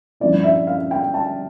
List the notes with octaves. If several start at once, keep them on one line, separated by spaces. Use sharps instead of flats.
G2 F3 C#4 E4 D5
E5
F5
G5
A5